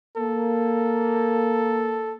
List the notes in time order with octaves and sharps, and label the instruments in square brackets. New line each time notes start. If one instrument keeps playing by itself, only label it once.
[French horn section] A#3 [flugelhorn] A4